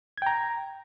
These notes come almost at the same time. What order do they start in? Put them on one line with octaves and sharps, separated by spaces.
G#6 G5 A#5